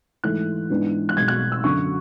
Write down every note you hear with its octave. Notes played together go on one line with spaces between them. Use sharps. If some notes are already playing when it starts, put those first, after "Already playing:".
G#2 E3 A3 F#6
G#2 E3 B3 D4
F#6
B1 B2 G#3 G#6
F#6
E6
F#2 D3 F#3 C#6